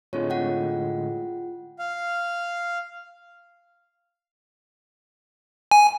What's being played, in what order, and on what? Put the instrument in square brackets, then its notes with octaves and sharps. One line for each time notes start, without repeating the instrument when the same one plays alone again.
[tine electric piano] A2 D3 G#3 [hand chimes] C4 F4 C#5
[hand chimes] F4 F#5 G5
[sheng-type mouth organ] F5
[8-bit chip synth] G#5